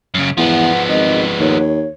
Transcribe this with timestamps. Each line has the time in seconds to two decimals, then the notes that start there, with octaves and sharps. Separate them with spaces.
0.14 F#2 C#3
0.37 E2 F3 B3 F#5
0.88 G#1 D#5
1.39 D#2 C#5